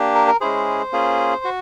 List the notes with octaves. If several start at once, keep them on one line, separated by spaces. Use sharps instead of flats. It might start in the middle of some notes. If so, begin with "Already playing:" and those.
Already playing: A#3 D4 G4
A#4
A#4
G#3 C#4 E4 G#4 C5
A#3 C#4 F4 G#4
F#4